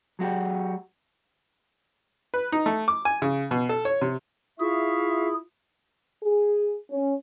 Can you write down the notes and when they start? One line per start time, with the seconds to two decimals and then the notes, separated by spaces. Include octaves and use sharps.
0.19 F#3 G#3 F#4 G4
2.34 B4
2.52 D#4
2.66 A3
2.88 D6
3.05 G#5
3.22 C#3
3.51 B2
3.69 A4
3.85 C#5
4.01 C3
4.60 E4 F4 G#4 E5 F5 C#6
6.23 G#4
6.91 C#4